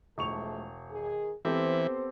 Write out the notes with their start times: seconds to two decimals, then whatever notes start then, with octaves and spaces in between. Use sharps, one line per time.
0.18 E1 F3 G#3 A3 C#6 F7
0.91 D#3 G#4
1.45 E3 B3 C4 G4 A4 C5